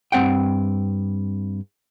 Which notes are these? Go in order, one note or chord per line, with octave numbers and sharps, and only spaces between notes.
G2 C4 F#5 G5